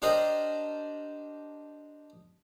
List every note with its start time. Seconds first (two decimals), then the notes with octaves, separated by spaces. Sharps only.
0.02 D4 G4 A#4 C5 D5 D#5